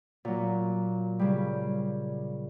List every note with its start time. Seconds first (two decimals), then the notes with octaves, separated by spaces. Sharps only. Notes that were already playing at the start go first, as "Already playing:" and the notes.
0.25 A#2 F#3
1.19 C#3 G3